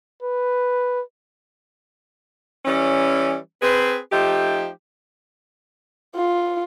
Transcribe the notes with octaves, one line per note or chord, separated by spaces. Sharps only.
B4
E3 G3 C#4
C4 G#4 B4
F3 A3 D#4 G4
F4